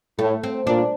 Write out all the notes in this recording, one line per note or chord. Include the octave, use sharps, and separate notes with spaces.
A2 A3
C4
A#2 D4